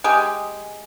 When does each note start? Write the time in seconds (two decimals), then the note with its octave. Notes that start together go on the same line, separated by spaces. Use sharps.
0.04 G#3 G4 G#4 G5